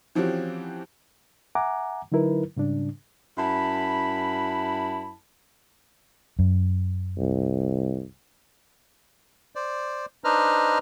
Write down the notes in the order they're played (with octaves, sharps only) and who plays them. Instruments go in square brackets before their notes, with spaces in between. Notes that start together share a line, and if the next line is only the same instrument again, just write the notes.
[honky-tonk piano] E3 F3 C4 C#4 F#4 G4
[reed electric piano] E5 F#5 G#5 A#5 D6
D3 F#3 D#4 E4 A#4 B4
G#2 C#3 G3 D4
[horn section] F#2 E4 A5 B5
[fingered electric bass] F#2
[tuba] C2
[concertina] C5 D5
D4 D#4 B4 C5 D#5 F6